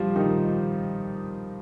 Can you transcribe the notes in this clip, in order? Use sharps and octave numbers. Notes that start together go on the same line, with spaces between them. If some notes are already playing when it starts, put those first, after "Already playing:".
Already playing: F3 G3 C4 F4 G4
D#3 D#4